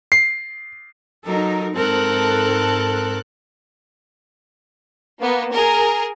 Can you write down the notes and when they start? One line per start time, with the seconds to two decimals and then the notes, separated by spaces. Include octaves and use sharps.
0.12 C7
1.25 F#3 D#4 A4 A#4
1.74 G#2 C4 A4 A#4 F#6
5.20 A#3 B3
5.52 G#4 A#4